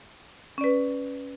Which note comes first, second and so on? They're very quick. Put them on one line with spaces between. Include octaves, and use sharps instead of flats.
C#4 D5 B4